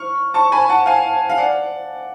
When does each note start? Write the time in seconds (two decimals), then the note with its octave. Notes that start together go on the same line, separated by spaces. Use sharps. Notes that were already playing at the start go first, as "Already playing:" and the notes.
Already playing: C#6 F6
0.34 A5 C#6
0.52 G#5 B5
0.69 F#5 A5
0.86 F5 G#5
1.29 F5
1.37 D5 F#5